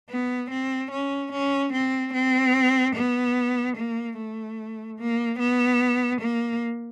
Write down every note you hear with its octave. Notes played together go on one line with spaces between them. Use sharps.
B3
C4
C#4
C#4
C4
C4
B3
A#3
A3
A#3
B3
A#3